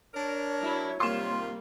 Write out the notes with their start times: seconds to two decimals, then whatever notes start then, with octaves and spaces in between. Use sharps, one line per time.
0.14 D4 A#4 C#5
0.59 F#3 E4
1.00 C3 D#3 G3 A#3 F4 C6 E7